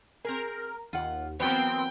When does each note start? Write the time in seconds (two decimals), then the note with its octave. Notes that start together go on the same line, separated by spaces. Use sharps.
0.25 C4 G#4 A#4
0.93 D#2 F4 F#5
1.40 E3 F#3 B3 C4 A#4 G5